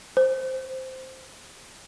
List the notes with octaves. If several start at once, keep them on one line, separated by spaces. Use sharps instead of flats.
C5